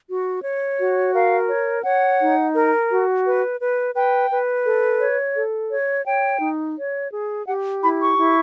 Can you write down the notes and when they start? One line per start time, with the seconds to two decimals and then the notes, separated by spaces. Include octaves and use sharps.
0.09 F#4
0.43 C#5
0.78 F#4
1.15 A#4 F5
1.49 C#5
1.84 C#5 F#5
2.20 D#4
2.54 A#4
2.90 F#4
3.26 B4
3.61 B4
3.95 B4 G5
4.30 B4
4.65 A4
5.00 C#5
5.35 A4
5.71 C#5
6.06 C#5 G5
6.41 D#4
6.77 C#5
7.12 G#4
7.47 G4 F#5
7.82 E4 B5
8.00 C#6
8.18 E4